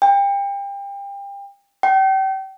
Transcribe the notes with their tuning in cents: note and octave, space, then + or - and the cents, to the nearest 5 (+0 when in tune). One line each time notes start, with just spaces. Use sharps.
G5 +30
G5 -35